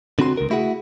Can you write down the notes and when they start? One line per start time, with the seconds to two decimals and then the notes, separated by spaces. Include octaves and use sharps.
0.19 D3 C4 F#4 B5 C6
0.37 C#2 A#4
0.50 A3 E4 F#4 G#4 F#5